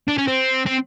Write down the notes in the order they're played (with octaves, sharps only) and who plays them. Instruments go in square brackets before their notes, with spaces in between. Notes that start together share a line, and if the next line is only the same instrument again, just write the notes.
[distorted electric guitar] D4
C#4
C4
C4